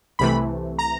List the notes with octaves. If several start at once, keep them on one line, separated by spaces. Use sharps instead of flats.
C2 C3 E3 A3 B5
A#5